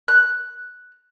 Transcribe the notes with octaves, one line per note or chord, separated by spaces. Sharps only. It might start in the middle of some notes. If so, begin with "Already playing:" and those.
F#6